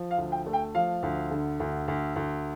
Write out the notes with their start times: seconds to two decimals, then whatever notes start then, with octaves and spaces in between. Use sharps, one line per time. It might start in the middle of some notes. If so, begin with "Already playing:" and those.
Already playing: F3
0.11 F5
0.18 D2
0.32 G5
0.46 A3
0.53 G5
0.75 F3 F5
1.03 D2
1.31 D3
1.60 D2
1.88 D2
2.16 D2